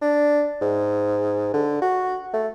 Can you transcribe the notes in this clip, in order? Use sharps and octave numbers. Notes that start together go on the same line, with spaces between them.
D4
G#2
D3
F#4
A3